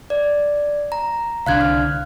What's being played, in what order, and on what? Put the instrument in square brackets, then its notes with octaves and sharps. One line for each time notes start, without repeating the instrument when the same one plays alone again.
[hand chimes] D5
A#5
[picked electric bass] C2 D3 [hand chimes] F5 F#6 G#6
[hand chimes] F6